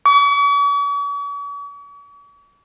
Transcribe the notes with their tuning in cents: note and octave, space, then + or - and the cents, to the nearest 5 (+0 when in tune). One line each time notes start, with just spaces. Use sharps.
C#6 +45